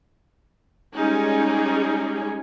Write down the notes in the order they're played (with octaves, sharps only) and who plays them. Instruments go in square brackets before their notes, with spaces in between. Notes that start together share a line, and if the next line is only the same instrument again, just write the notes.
[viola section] G3 G#3 C#4 D#4 G#4 G#5